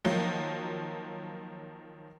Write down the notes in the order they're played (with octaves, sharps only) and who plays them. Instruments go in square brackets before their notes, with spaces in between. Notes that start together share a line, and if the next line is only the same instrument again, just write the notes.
[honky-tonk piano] D#3 F3 F#3 A#3